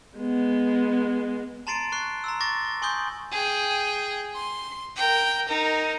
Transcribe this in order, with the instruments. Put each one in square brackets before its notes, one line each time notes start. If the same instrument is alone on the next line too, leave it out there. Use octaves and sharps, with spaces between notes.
[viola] G#3 B3
[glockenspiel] A5 A#5 C6 A6 C7 D7
C#6 F#6 C7
A#5 C6 E6
C#6 D6 A6 A#6
C#6
G#5 C6 C#6 D#6 G6
[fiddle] G#4 G5
C6
A#4 G5
D#4 A#4